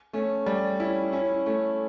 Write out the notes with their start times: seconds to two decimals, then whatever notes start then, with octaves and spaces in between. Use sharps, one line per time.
0.13 A3 C#4
0.46 G3
0.80 C#4 E4
1.12 C#4 E4
1.46 A3 C#4